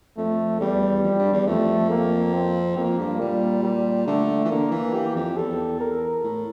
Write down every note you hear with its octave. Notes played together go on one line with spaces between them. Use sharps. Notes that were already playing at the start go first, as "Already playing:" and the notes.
F2 A3
E2 G3
F2
G2
E2
F2 A3
A#3
C4
F2 A#3
G2
A#2 G3
G3
D3 A3
E3
D3 A#3
E3
E3 G4
F2
E2 A4
A#4
A2